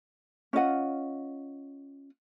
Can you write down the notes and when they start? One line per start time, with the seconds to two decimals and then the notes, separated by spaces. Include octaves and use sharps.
0.53 C#4 F4 D#5 F#5